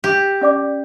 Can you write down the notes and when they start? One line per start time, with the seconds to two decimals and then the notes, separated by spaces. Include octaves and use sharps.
0.04 G4
0.41 C#4 D5 D6